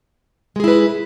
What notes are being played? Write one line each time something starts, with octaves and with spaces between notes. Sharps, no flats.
G#3 E4 G#4 B4